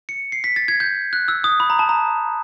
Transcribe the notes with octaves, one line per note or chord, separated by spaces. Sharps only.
C#7
C7
B6
A6
G#6
G6
F#6
E6
D#6
B5
A#5
A5
A#5